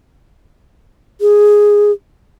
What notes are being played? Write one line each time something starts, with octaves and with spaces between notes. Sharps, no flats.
G#4